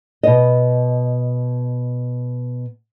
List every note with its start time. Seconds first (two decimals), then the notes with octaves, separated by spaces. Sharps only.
0.23 B2 D#5